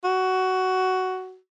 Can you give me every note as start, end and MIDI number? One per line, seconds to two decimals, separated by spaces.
0.04 1.38 66